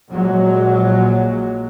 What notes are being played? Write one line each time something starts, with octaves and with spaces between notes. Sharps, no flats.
A#1 A#2 F#3 G#3